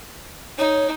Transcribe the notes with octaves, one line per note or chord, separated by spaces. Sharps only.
D#4 C#5